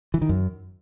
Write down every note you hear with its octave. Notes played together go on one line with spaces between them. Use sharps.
E3
D#3
F#2